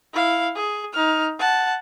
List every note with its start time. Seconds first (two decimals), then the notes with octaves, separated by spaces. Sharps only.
0.13 E4 F5
0.56 G#4
0.93 D#4 F6
1.39 F#5 A5